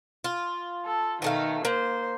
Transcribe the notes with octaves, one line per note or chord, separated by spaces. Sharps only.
F4
A4
B2 D#3 A3 F5
A#3 C5